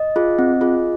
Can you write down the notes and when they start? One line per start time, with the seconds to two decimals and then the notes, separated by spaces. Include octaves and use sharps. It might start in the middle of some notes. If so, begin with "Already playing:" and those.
Already playing: D#5
0.16 F4 G#4
0.39 C4
0.61 F4 G#4